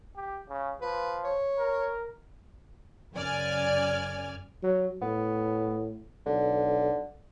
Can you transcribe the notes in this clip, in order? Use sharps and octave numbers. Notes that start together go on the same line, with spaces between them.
G4
C#3
F3 B4
C#5
A#4
F#2 C#3 D5 G#5 F6
F#3
A2 B3
B1 D3